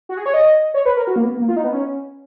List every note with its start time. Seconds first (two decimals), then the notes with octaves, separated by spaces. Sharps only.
0.09 F#4
0.17 G#4
0.26 C#5
0.34 D#5
0.74 C#5
0.86 B4
0.97 A#4
1.07 F#4
1.16 A#3
1.23 B3
1.40 A#3
1.49 F4
1.56 D#4
1.64 B3
1.73 C#4